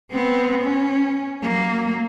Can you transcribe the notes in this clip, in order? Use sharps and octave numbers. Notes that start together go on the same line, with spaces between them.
B3 C4
C#4
F#3 A#3